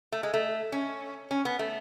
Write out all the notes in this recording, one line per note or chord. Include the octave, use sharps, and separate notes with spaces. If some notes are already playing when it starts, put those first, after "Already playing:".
A3
G#3
A3
C#4
C#4
B3
A3